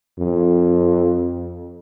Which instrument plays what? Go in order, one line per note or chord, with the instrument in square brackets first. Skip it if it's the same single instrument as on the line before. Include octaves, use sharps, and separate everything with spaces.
[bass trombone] F2